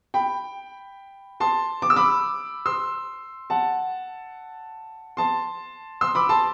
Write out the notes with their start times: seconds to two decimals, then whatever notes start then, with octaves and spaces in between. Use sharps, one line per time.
0.14 G5 B5
1.40 A5 C6
1.82 D6
1.90 E6
1.96 B5 D6
2.66 C6 E6
3.50 F#5 A5
5.17 A5 C6
6.01 C6 E6
6.15 B5 D6
6.29 A5 C6